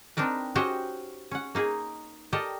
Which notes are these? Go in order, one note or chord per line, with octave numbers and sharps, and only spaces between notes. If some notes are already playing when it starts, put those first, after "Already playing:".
C4 D4 D#4 A#4 B4
C#4 F#4 G4 C5 D#5 G5
C#4 F#5
A#3 D#4 G#4
G4 A4 A#4 D5 D#5